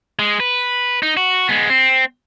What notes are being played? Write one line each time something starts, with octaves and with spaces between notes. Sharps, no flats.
G#3
B4
D#4
F#4
G#3 B3
C4